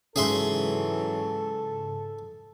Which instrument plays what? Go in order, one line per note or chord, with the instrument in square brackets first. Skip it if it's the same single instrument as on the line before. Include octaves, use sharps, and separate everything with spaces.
[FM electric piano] G#2 C#3 [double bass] E3 F#3 [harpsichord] G#4 E5 C6 [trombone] A4